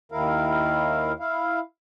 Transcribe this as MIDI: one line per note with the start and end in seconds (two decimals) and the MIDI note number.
0.12 1.12 39
0.12 1.12 51
0.12 1.12 64
0.12 1.12 70
0.12 1.12 77
1.20 1.59 64
1.20 1.59 77